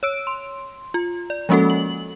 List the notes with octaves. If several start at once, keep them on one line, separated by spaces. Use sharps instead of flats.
C#5 E6 D7
C6
F4
D5
F3 G#3 A#3 C#4 F#4 A4
F#7